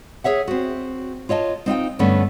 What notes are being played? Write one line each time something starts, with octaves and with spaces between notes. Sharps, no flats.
G#4 C#5 E5 F#5
C4 F#4
F4 C#5 D#5 A5
C4 D#4 F4 G5
G2 D3 A3 B3 C#4